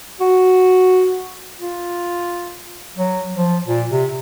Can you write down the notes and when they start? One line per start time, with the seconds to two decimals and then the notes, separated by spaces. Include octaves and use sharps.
0.20 F#4
1.59 F4
2.97 F#3
3.33 F3
3.66 A#2
3.90 C3